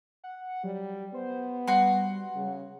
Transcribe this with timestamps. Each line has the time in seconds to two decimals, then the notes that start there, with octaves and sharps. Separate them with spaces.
0.24 F#5
0.64 F#3 G3
1.14 B3 C5
1.68 G3 F#4 C6
2.36 C#3